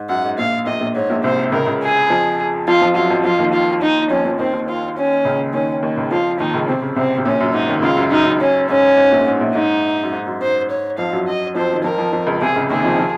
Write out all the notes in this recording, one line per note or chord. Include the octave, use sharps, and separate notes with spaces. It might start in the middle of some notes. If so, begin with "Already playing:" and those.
Already playing: G#2
F#2 F#5
G#2
A#1 A#2 F5
A#1 A#2 D#5
A#1 A#2
G#2 C#5
A#1 A#2
C2 C3 C5
C#2 C#3 A#4
C#2 C#3
G#4
F2 F3
F2 F3 F4
F2 F3
F#2 F#3 F4
F2 F3
F2 F3 F4
D#2 D#3
F4
D#4
F2 F3 C#4
F2 F3
D#2 D#3 C4
D#2 D#3
F4
C#4
C#2 C#3
D#2 D#3 C#4
D#2 D#3
C#2 C#3
F2 F3 F4
D#2 D#3 D#4
C#2 C#3
C3 C4
C#3
C2 C3 C4
C3
A#1 A#2 C#4
F#2
G#2 D#4
D#2 D#3
C#2 C#3 F4
F#2
F#2 D#4
F#2
C#4
G#2 C#4
G#2
A#1 A#2
G#2
A#1 A#2
G#2 D#4
F#2
G#2
F#2
G#2 C5
C#5
F2 F3 F5
F#2 F#3
D#5
F2 F3 C5
D#3
F2 F3 A#4
F2 F3
F2 F3
C#2 C#3
C2 C3 G#4
C#2 C#3
D#2 D#3 G#4
F2 F3
F3